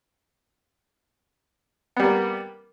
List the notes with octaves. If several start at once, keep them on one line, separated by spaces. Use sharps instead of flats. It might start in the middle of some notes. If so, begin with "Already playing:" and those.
G3 A#3 B3